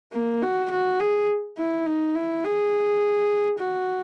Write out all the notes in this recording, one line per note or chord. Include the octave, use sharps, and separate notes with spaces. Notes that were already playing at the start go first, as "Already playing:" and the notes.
A#3
F#4
F#4
G#4
E4
D#4
E4
G#4
F#4